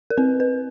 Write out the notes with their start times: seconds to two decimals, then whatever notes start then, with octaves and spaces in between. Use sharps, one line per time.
0.10 A#4
0.17 C4 B4
0.40 B4